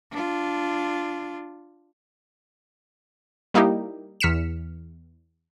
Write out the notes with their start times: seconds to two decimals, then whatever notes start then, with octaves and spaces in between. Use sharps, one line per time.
0.11 D4 F4
3.54 G3 A#3 D#4 E4 G4
4.20 E2 F6 B6 C#7 E7